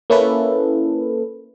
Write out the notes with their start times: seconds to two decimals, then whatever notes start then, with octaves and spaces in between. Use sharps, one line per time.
0.10 A#3 C#4 E4 A4 B4